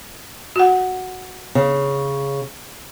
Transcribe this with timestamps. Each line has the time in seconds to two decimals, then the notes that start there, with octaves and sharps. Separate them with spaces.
0.56 F#4 F#5
1.55 C#3